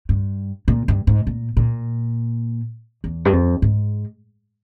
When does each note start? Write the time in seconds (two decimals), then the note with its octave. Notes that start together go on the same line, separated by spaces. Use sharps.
0.09 G2
0.68 A#2
0.88 G2
1.07 G#2
1.27 A#2
1.57 A#2
3.04 E2
3.25 G2
3.33 F2
3.62 G#2